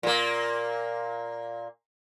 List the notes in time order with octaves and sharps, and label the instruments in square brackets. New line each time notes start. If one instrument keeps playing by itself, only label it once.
[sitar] A#2 A#3